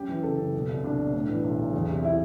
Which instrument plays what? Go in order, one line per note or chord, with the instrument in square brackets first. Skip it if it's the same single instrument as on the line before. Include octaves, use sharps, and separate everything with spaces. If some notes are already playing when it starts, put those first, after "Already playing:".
Already playing: [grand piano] F#2 G4
E3
F#1 A4
F#1
B2
C2
C2 D4
B2
A2
E3
B1
B1
E2
C3
E4